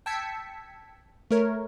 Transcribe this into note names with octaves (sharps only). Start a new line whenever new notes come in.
G5 A5 E6 G#6 B6 C#7
A3 A#4 C#5